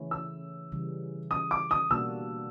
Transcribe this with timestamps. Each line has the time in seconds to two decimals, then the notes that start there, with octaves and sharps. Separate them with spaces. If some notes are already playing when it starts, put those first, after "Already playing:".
Already playing: C#3 E3 A3 C#4 E4
0.11 E6
0.72 C#3 E3 G3
1.31 D#6
1.51 D6
1.71 D#6
1.90 B2 G3 A#3 D4 F#4 E6